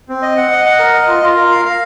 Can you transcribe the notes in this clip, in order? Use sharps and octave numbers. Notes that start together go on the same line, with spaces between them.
C4
D#5
F#5
D#5
F#5
A#4
D#5
F4
F4
A#4
F5
F5